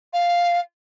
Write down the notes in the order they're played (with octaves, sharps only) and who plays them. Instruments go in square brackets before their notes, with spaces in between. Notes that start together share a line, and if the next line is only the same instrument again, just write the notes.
[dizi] F5